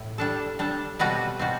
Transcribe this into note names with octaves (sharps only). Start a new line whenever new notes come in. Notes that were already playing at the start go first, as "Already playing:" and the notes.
Already playing: A2 E4
G3 D4 A4
G3 D4 A4
B2 G3 C4 F#4 B4
B2 G3 C4 F#4